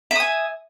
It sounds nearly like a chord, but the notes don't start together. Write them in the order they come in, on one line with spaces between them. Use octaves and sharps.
E5 D#6 G#5